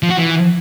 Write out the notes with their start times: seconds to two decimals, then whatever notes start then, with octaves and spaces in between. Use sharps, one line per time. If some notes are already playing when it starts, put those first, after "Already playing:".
0.03 F3
0.10 F#4
0.18 E3